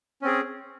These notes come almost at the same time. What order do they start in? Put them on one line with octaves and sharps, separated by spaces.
C#4 C4 G#4